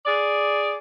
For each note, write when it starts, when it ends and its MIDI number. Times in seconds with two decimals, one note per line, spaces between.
0.06 0.75 68
0.06 0.75 74